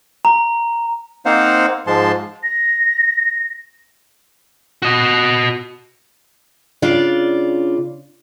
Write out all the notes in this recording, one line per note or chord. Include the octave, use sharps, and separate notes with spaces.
A#5
A#3 C4 D#4 C5 F5 F#5
G#2 F3 G#3 A5 C6
A#6
F#4 D#5
C#3 D4 F4 D5